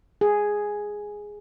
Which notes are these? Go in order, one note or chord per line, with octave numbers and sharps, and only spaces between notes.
G#4